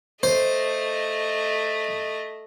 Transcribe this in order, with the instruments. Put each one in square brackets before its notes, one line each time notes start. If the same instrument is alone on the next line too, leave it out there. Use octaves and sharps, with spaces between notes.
[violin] A3 D#5 [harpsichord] C5